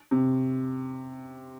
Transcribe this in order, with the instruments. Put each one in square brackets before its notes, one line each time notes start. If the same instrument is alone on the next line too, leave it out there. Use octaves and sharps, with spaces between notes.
[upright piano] C3